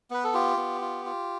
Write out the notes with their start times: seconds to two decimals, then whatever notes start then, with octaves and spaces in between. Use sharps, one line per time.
0.10 B3 B4
0.24 A4
0.34 F4 G4
0.57 B3
0.81 F4
1.06 F4